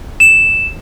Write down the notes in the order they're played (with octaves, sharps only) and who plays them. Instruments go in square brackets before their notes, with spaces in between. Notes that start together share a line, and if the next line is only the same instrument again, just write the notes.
[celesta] E7